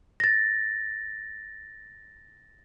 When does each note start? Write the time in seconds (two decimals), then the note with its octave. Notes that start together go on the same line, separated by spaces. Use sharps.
0.20 A6 A#6